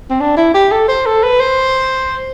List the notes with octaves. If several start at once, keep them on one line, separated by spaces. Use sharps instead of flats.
C4
D4
E4
G4
A4
C5
A4
B4
C5